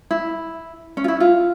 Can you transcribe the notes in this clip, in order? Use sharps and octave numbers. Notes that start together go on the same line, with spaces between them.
E4
C#4
F4
E4
F4